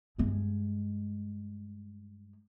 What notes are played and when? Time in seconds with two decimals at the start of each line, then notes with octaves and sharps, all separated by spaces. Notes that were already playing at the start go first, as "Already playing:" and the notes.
0.18 G2 G#3